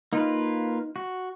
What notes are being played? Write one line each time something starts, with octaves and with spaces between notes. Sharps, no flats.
A#3 D#4 F4 B4
F#4